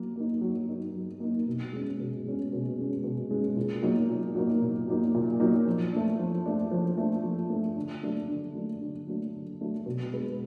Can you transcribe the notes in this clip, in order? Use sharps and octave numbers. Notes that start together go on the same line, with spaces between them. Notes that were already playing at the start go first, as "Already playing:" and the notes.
Already playing: F#3 A#3
A#3 D#4
F#3
A#3 D#4
F#3
A#3 D#4
B2
G#3 C#4
B2
G#3 C#4
B2
G#3 C#4
B2
G#3 C#4
A#2
F#3 A#3 D#4
A#2
F#3 A#3 D#4
A#2
F#3 A#3 D#4
A#2
F#3 A#3 D#4
F3
A3 D4
F3
A3 D4
F3
A3 D4
F3
A3 D4
D3
F#3 A3 D4
D3
F#3 A3 D4
D3
F#3 A3 D4
D3
F#3 A3 D4
B2
G#3 B3